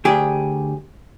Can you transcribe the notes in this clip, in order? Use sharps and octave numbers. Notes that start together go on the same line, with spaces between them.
D2 G4 G#4